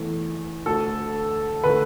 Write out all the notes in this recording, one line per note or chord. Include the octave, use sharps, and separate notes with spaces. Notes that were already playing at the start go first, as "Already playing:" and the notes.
Already playing: E2 E3 A3
D2 D3 A3 A4
D3 A3 B4